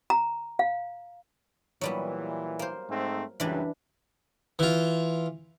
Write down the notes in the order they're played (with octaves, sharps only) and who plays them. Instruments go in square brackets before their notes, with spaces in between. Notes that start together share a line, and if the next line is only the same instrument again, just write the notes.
[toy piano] A#5
F5
[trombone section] A#2 E3 [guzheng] F#3 G3 B3
[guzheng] A#3 C5
[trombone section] G#2 A3 C4
[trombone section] C#2 F#2 G3 [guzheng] E3 D4 B4
[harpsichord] E3 F4